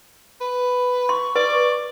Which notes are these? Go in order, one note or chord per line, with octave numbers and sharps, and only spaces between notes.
B4
C6 C#6
B4 D5